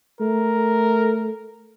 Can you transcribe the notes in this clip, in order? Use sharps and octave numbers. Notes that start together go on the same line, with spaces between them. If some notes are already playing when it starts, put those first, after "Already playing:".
A3 A#4